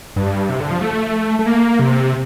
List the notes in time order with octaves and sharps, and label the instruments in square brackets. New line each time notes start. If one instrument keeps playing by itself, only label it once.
[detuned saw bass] G2
C3
D3
F3
A3
A3
A#3
C3